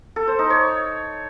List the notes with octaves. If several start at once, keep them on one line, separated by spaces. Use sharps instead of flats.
A4
C5
D#4
C#5